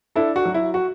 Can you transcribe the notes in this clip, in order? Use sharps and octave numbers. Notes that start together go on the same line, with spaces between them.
D4 E4 A4
F#4
F#3
E4
F#4